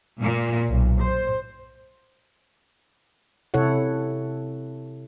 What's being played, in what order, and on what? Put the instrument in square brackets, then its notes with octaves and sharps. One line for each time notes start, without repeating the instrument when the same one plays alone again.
[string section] A#2
B1
C5
[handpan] C3 E4 A4 C#5 F#5